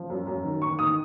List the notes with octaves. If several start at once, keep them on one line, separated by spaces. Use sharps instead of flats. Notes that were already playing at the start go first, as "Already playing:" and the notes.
Already playing: F3
F#2
F#2
D#3
D#3 C#6
D#3 D#6